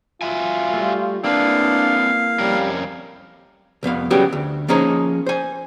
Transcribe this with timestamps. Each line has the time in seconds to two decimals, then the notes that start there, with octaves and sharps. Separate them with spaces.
0.22 F4 F#4 E5 G#5
0.74 G3 A3
1.24 A#3 C4 D4 E4 G#4 B4 F5
2.39 F2 G3 C#4 A#4
3.83 C2 F2 B3 F5
4.10 C#3 F#3 G3 B3 F#4 G4
4.33 D2
4.68 F3 A#3 C#4 D#4 G#4 C5
5.26 C5 G#5